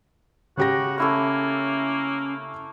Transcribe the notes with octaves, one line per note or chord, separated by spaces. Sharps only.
C#3 F#4 G4 A#6
A3 A#3 C#4 E4 C#6